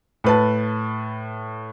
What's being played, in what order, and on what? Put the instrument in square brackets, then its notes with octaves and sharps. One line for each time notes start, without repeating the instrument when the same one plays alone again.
[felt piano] A2 B4 A5